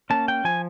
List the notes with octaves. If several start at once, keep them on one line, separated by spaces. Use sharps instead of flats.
A#3 C#4 A5
G5
F3 G#5